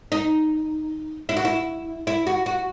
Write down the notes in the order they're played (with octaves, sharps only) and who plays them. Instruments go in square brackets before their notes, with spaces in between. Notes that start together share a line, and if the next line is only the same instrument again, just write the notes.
[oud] D#4
E4
F#4
E4
E4
F#4
F#4